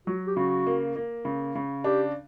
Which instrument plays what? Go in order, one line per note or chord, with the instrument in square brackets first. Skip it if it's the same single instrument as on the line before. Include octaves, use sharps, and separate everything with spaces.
[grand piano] F#3 [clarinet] F#4
[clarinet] G4
[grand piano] C#3 [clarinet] F#4
[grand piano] A#3
A#3
C#3
C#3
[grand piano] D4 [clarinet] G4